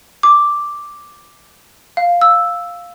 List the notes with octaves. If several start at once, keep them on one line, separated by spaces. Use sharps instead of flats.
D6
F5
E6